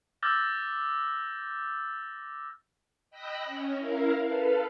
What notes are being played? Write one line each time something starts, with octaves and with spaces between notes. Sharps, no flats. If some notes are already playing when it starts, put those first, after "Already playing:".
D6 E6 F6 G6 A6 A#6
D#5 G5 B5 E6 F#6 A#6
C#4
E4 A#4 F5
A4 B4 F5